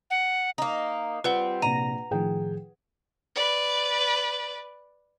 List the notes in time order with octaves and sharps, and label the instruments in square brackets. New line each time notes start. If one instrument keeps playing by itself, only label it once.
[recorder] F#5
[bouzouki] A#3 D#4
[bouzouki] G3 C4 [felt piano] F4 [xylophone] B4 F#5 G7
[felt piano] A#1 [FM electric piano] C3 A#6 [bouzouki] A#5 [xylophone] D#7
[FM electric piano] A2 D#3 F3 [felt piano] G#4 G5
[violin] B4 D5